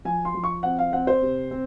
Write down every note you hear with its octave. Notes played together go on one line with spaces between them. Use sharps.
F3 G#5
C6
F3
C#6
C4 F#5
F5
C4 F#5
C5
C3
C4